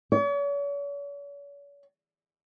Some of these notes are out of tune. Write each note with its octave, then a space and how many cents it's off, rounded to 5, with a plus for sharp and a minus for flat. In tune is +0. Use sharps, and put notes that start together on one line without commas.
C#5 +45